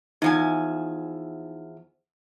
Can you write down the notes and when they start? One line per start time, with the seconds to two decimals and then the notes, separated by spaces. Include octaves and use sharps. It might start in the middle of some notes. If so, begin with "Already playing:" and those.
0.22 E2 F3 D#4 G#5